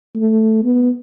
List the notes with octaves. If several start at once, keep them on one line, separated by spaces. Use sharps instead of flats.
A3
B3